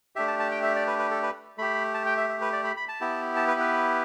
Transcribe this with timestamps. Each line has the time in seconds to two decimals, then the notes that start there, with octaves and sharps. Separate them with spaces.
0.16 A3 D4 G4 E5
0.28 A5
0.39 A5
0.51 G5
0.63 E5
0.76 D5
0.87 B4
0.99 B4
1.11 A4
1.23 B4
1.58 A3 G4 B5
1.94 A5
2.06 G5
2.17 E5
2.29 E5
2.41 B4
2.53 D5
2.64 B5
2.77 B5
2.88 A5
3.01 B3 E4 G4
3.36 A5
3.48 B4
3.60 B4